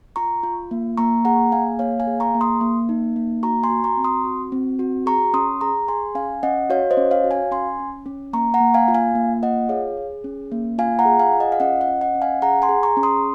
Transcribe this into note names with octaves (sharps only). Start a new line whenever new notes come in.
F4 A#5 C#6
F4
A#3
A#3 A#5 C#6
G#4 F#5 A#5
A#3 F5 G#5
A#3 C#5 F5
F5 G#5
G#4
A#5 C#6
A#3
C6 D#6
A#3
D#4
A#3
F#4 A#5 C#6
G#5 C6
F#4
A#5 C#6
C4
C6 D#6
F#4
C4
F#4
G#4 A#5 C#6
C#4 C6 D#6
G#4 A#5 C#6
G#4 G#5 C6
C#4 F5 G#5
C#4 D#5 F#5
F#4 C#5 F5
C5 D#5
C#4
C#5 F5
F#4
F5 G#5
C#4 G#5 C6
C#4
C#4
A#3 A#5 C#6
F#5 A#5
A#3
F5 G#5
F4
F5 G#5
A#3
F4 D#5 F#5
G#4 C#5 F5
G#4
C#4
A#3
F4 F5 G#5
F#5 A#5
G#4
F5 G#5
F4
D#5 F#5
F5
C#4 D#5 F#5
D#5 F#5
C#4
D#5 F#5
C#4
F5 G#5
G#4 F#5 A#5
G#5 C6
G#4
A#5 C#6
C#4
C6 D#6